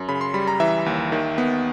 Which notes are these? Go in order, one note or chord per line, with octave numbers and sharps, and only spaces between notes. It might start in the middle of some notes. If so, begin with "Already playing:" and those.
Already playing: F#2
C#3 B5
C6
G3 B5
A#5
E3 E5
D#2
D#3
B3